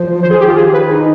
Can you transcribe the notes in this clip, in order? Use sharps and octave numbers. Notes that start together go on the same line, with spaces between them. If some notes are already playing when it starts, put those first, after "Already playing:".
Already playing: F3 C5
D#3 C5
G#4
G4
F4
G#4
B4
D#4